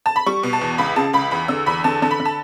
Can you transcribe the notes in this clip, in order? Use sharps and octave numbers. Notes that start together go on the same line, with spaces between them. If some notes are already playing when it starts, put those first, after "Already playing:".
A5
B5
G3 C#6
B2
A5
E2
C#2 B5
C#3 A5
C#2 B5
E2 B5
D3 E6
E2 B5
D3 A5
D3 A5
B5
D3
A5